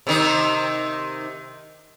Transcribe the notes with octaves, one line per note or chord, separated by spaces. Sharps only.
C3 D#3 D#4